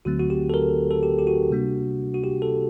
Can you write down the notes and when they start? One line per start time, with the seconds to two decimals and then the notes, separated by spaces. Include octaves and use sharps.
0.05 D2 D3 F#3 A3 C4 F#4
0.20 F#4
0.30 G4
0.50 A4
0.54 A#4
0.91 A4
1.03 G4
1.19 G4
1.27 F#4
1.50 C3 G3 A#3 D4
2.14 F#4
2.24 G4
2.42 A4